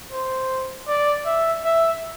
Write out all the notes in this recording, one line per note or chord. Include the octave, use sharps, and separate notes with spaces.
C5
D5
E5
E5